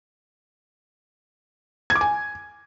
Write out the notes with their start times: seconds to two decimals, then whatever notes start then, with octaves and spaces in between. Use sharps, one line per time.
1.90 G#6
1.96 D6
2.01 G#5